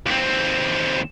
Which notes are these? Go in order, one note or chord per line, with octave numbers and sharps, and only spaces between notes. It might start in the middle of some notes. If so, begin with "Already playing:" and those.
D#2 C4